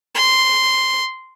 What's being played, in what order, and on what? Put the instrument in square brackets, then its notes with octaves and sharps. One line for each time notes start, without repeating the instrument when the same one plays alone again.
[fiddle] C6